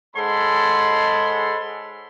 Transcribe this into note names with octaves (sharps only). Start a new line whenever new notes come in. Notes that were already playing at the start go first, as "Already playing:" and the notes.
G#2 G#3 A4 C#5 B5 C6